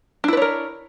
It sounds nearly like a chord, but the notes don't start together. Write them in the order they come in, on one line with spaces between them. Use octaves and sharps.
D4 E4 B4 C#5 A#4